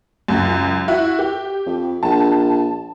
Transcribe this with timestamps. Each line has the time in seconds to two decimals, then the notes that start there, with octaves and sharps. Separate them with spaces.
0.28 C#2 F#2
0.88 E4 F#4
1.19 G4
1.66 F2
2.03 A#1 A5